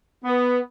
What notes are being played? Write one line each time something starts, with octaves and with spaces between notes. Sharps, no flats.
B3